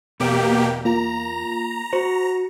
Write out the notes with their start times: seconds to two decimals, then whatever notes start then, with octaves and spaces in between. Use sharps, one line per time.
0.20 E2 B2 A#3 G4 D5 E5
0.85 A#3 F4 A#5
1.93 F#4 C5